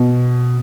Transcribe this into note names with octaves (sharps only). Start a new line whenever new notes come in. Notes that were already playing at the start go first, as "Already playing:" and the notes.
Already playing: B2